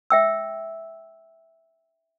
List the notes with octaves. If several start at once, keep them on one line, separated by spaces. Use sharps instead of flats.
E5 G5 E6